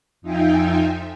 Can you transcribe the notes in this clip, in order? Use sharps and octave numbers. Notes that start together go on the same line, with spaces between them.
F2 D#4 F4 E5 G5 G#5